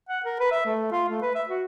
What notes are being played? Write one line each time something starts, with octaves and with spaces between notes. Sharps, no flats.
F#5
A#4
B4
E5
A3
F4
A3
B4
E5
F#4